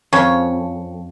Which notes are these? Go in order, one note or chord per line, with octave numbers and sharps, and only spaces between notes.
F2 C#4 G#4 C#5